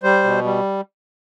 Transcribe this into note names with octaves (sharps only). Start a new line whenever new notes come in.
G3 C5
B2
G3